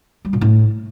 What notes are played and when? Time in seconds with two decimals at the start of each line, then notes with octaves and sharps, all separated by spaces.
0.25 G3
0.33 A#2
0.41 A2